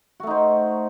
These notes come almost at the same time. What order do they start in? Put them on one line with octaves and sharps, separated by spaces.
F#4 A3 D#4 C5